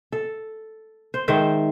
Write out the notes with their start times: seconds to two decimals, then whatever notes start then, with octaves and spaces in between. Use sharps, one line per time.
0.12 A4
1.14 C5
1.28 G#2 D#3 C5 E5